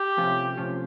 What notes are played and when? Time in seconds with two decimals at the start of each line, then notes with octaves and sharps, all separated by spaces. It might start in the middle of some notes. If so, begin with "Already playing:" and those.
Already playing: G4
0.17 C3 F3 A3 C#4 F4
0.57 C3 F3 A3 C#4 F4